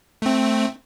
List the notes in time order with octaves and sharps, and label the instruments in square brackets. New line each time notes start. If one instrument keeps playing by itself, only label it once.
[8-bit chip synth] A3 C4